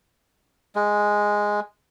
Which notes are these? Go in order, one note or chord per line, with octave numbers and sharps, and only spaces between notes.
G#3